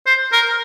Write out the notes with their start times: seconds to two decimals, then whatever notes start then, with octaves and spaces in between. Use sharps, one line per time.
0.06 C5
0.32 A#4